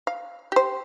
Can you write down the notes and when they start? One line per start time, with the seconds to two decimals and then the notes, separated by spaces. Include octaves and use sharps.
0.07 F5
0.52 G4 C5